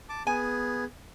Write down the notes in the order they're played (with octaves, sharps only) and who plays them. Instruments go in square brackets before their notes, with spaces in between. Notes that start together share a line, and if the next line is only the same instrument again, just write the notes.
[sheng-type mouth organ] A5 D6
[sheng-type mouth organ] B3 G#4 [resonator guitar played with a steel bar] G#5